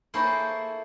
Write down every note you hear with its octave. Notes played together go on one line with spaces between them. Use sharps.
A#3 E4 G#4 A4 C5 C#5